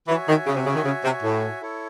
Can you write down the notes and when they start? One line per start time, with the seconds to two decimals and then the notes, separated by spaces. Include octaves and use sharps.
0.08 E3 F#4 C#5 E5 G#5
0.27 D#3
0.47 C#3
0.56 C3
0.66 C#3
0.75 D#3
0.85 C#3
1.04 C3
1.23 A2
1.61 E4 A4 C#5